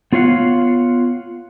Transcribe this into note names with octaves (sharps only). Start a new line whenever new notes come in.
B3 F4 C#5 F5 F#5